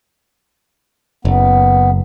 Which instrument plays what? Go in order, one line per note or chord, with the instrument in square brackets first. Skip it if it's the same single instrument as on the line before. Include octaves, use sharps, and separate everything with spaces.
[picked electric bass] F#1 [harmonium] B3